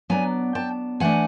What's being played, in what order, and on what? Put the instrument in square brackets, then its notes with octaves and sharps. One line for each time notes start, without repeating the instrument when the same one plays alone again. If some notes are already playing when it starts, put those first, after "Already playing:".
[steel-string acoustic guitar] F#3 B3 D4 G#5 A#5
G5 A5
E3 A3 D4 F#5 G#5